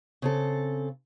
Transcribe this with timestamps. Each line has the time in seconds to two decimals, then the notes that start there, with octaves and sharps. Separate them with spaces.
0.22 C#3 C4 A4